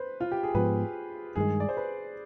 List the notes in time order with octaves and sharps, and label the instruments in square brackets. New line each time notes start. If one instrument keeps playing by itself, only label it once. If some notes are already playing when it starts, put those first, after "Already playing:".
Already playing: [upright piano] B4 C5
F4
G4
G#4
[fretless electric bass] G#2 F3 B3 [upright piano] B4
[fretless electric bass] G2 D#3 G#3 [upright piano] G#4
[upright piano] D5
C5
B4